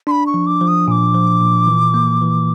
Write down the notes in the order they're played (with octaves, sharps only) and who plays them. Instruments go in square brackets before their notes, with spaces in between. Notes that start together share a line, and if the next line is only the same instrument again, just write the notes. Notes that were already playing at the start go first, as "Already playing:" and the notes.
[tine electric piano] D4 [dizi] C6
[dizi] B5
C#6
[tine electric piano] F3
[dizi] D6
[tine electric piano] F3
[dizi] D#6
[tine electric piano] A#2 [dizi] D#6
[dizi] D6
[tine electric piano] F3
A#2
E3
A#3
E3